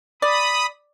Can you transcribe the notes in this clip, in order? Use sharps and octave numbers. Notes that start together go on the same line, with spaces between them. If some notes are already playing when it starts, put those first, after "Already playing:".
D5 B5 D#6